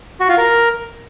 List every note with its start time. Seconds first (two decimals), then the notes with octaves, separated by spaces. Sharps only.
0.20 F#4
0.29 F4
0.38 A#4